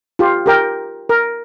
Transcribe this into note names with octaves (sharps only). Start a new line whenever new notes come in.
F4 G4
G4 A#4 G5
A#4